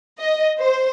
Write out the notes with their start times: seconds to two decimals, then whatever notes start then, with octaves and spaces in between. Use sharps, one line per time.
0.19 D#5
0.59 C5